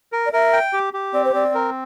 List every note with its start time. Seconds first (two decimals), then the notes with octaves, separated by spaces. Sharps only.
0.12 A#4
0.26 D5
0.33 A#4 E5
0.53 G5
0.73 G4
0.94 G4
1.13 C4 D5
1.25 C5
1.34 C4 D5
1.55 A#4